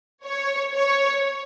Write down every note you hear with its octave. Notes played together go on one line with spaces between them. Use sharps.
C#5
C#5